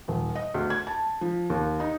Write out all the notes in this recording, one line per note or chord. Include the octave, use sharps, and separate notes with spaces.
D#1
D#5
D2
G#6
A5
F3
D#2
D#4